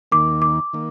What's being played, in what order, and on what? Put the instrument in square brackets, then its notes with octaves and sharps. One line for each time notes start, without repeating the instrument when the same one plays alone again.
[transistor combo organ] D#2 D#3 A#3 [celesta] D6
[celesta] D6
[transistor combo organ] D#3 A#3